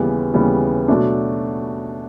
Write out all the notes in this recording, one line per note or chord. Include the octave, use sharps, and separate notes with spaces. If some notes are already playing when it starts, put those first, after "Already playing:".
Already playing: D#2 C#3 E3 G3 B3
D#2 C#3 E3 G3 B3
B2 F#3 A3 D4